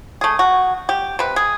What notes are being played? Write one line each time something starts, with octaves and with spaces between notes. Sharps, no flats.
A3 G#4
F#4
G4
C3 B4
G#4